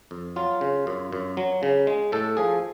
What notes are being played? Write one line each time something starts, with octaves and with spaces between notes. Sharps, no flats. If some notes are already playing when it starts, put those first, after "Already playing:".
F2
F#3 F4
C#3
F#2
F#2
F#3
C#3
G#3
A2 A4
F3 G#4